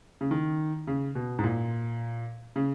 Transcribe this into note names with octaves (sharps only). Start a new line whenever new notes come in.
C#3
D#3
C#3
B2
G#2
A#2
C#3